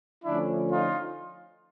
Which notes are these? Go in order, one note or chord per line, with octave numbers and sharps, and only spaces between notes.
D3 F3 A3 C#4 D4 E4
D#4 F4